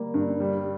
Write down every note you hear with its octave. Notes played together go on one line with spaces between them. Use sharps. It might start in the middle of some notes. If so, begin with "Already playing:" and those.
Already playing: G3 A#3
G2
G3